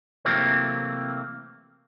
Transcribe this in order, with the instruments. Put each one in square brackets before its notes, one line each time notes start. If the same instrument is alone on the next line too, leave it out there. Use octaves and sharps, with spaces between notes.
[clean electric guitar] C3 E3 F#3 A3 A#3 C4